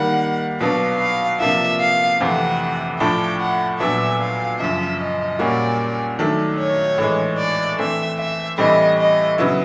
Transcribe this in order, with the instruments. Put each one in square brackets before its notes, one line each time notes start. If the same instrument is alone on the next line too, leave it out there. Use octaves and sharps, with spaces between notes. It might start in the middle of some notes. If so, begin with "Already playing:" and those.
Already playing: [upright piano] D#3 G3 A#3 [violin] F#5
[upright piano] B2 F#3 B3 D4 [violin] F5
[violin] F5
[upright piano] C3 F3 A#3 D4 F4 [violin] E5
[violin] F5
[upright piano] F2 C3 E3 A3 C4 [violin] F#5
[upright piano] A2 F3 A3 D4 [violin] G5
[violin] F#5
[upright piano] A#2 F#3 B3 D4 [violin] E5
[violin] F5
[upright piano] F#2 C#3 F3 [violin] E5
[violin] D#5
[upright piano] A#2 G3 A#3 C#4 F#4 [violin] D5
[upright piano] D#3 F#3 A3 D4
[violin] C#5
[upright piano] A2 E3 G#3
[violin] D5
[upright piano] E3 A3 C4 [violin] E5
[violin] E5
[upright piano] A2 E3 G3 C4 E4 [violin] D#5
[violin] D#5
[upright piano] C#3 F#3 B3 E4